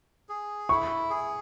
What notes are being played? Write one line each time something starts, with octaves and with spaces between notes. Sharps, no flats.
G#4
E4 C#6
G#4